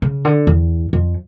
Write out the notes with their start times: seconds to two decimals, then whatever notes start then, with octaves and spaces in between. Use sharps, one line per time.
0.02 C#3
0.25 D3
0.47 E2
0.93 F2